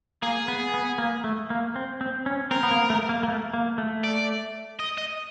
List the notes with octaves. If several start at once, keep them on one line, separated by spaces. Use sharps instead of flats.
A#3 G#4
B3
B3
A#3
A3
A#3
C4
C4
C#4
C4 A#4
B3
A#3
A3
A#3
A#3
A3
A#3
A3
D5
D#5
D#5